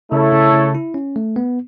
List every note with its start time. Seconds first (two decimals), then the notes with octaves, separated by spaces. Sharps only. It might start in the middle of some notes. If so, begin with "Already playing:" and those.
0.12 C#3 A3 E4 A4 C#5
0.32 C#3
0.53 C#3
0.75 E4
0.94 C#4
1.16 A3
1.36 B3